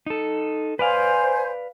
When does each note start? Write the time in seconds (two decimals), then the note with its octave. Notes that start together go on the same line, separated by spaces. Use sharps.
0.06 D#4 A4
0.79 B4 C5 D5 F5 G#5